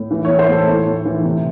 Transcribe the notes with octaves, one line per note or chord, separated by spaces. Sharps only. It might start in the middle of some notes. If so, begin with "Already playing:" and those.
Already playing: A2
E3
A2 C#5
C5
A2 A4
A2
A2
E3
C3